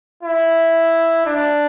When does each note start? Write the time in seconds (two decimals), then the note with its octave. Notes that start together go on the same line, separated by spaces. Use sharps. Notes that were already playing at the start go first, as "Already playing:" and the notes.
0.23 E4
1.26 D4